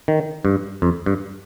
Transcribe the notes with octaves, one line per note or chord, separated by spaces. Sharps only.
D#3
G2
F2
G2